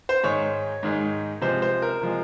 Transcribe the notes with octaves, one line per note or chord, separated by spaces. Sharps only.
C5
G#2 D#3 G#3 C#5
G#2 D#3 G#3
C3 F3 G#3 C5
C5
A#4
C3 F3 G#3